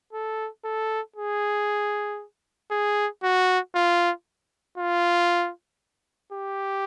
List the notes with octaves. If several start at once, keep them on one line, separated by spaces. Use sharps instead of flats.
A4
A4
G#4
G#4
F#4
F4
F4
G4